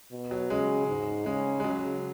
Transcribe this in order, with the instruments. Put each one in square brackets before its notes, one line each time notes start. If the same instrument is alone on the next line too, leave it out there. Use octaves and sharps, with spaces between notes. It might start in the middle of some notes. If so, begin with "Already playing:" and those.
[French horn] B2
[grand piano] F#3
[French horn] C#3 [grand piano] G#3
[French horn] G#2
[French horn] C#3 [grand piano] G#3
[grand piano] G#3
[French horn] C#3 [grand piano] F#3